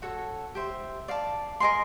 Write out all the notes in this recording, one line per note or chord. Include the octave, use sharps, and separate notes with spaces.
F#4 A4 C#5 F#5
G4 C5 E5
D5 F5 A5
A#4 D#5 G#5 C6